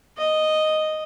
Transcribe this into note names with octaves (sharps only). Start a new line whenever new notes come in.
D#5